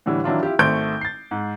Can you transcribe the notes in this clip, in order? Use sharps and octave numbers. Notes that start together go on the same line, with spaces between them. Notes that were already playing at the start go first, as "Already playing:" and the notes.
A2 D3 E3 G3
D#3 E3 F#3 D4 E4 F4
E4 F4 G4
G#1 A3 C5 C#6 G6 D7
A6 C7
G#2